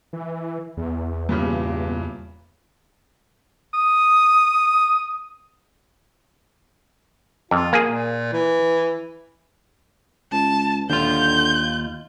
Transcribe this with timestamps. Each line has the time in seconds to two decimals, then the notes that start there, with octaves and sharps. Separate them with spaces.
0.13 E3
0.77 E2
1.29 G2 A#2 C#3
3.74 D#6
7.51 F2 F4
7.73 A#3 G#4
7.85 A#2
8.33 E3
10.32 C#2 A5
10.90 D#2 D3 F4 G6